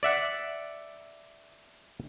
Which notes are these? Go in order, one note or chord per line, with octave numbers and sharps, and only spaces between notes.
D5 E5 F#5